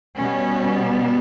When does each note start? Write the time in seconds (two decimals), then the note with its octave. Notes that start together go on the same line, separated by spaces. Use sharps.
0.16 B2 G3 B3 C#4